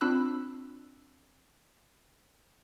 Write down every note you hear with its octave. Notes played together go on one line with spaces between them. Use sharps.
C4 D4 F4 B5 E6 F#6